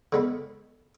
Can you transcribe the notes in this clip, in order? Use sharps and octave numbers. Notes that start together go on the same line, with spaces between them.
D3 G#3 B3